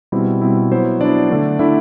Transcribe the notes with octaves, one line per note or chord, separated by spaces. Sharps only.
B2 G3 C4 E4
B2 G3 C4 E4
F#3 B3 E4 C5
F#3 B3 D4 E4 D5
D3 A3 D4
D3 A3 D4 E4 E5